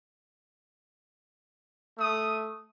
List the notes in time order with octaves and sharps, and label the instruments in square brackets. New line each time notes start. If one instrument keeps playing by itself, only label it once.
[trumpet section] A3 D#6